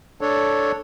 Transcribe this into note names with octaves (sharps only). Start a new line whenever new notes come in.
D4 A4 C#5